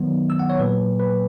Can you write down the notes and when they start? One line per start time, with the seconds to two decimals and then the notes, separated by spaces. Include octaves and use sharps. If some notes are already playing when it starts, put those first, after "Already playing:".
Already playing: D#3 F#3 B3
0.30 E6
0.39 F#5
0.50 C#5
0.59 A#2 F#3 A#3 B4
0.99 B4